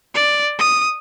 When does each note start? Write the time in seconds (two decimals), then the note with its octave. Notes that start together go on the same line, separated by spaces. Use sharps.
0.15 D5
0.59 D#6